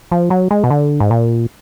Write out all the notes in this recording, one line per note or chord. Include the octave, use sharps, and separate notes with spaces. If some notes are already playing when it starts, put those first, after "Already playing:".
F3
F#3
G#3
B2
D3
G#2
A#2